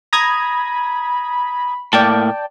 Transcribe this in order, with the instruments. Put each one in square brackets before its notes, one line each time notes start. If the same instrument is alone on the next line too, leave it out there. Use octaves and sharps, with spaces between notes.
[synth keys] A#5 D#6 G#6 [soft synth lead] B5
[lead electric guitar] A2 A#3 [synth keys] D5 G5 A5